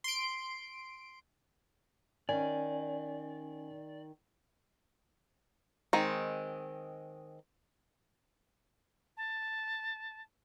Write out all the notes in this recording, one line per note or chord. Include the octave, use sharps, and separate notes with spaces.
C6 D7
D#3 C#4 D5 G#5
D#3 G#3 C4
A5